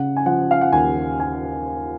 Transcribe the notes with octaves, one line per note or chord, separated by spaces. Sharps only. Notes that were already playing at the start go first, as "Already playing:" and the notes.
Already playing: C#3 F#5
G#5
F3 F#5
F5
F#5
D#2 G#5
G#5